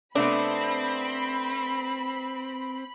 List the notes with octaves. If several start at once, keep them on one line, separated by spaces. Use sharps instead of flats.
C3 A3 B3 C4 D4 B5